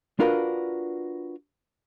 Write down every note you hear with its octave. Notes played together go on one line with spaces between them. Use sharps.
D4 F4 F#4 A#4 B4